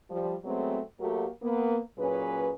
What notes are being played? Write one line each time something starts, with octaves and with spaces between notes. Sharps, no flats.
F3 G3
F#3 G#3 A3 B3 C4
F#3 A3 A#3 F#4 G4 A#4
A#3 B3
A#2 F#3 C#4 G#4 B4